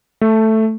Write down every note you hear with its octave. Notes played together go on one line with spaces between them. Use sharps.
A3